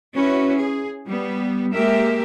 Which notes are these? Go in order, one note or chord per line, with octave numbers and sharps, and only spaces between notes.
C#4 E4 F#4 B4
G#4
G3 B3
G#3 A#3 G4 A#4 E5